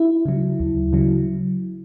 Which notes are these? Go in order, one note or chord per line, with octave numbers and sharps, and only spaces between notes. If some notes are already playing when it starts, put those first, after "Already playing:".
Already playing: E4
C#3 F#3
D2
C#3 F#3